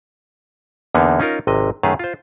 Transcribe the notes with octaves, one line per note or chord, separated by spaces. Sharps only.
E2 D3 A#3 B3 D#4
C#4 D#4 F4 A#4
G#1 C3 D#5
F#2 D#3 A3 G#4 B4 F5
F4 C5